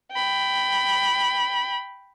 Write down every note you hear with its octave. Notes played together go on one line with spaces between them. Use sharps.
G5 B5